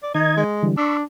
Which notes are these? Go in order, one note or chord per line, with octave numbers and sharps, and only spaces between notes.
D5
D#3 D#4 D#5 G#6
G#3
D3 E3 G3
D4 B5 C#6 E6